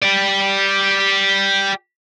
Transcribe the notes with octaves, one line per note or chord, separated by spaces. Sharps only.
G4 D5